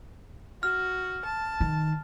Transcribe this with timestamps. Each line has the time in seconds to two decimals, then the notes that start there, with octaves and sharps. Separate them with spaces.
0.63 F#4 F6
1.25 A5
1.60 D#3